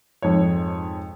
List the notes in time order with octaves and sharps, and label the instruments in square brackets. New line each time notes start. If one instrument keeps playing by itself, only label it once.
[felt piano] F2 G#2 C#5